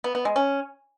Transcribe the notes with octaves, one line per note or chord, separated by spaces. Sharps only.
B3
B3
G#3
C#4